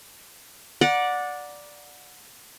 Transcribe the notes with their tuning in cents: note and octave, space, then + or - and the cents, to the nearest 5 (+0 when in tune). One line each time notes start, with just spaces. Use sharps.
D5 +0 F#5 -20 A#5 +30